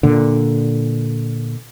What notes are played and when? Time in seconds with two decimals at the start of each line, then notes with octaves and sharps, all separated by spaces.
0.03 A#2 D3